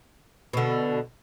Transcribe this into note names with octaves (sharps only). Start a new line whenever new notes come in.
B2 D3